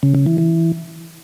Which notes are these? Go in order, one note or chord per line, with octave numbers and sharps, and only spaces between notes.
C#3
C#3
E3
E3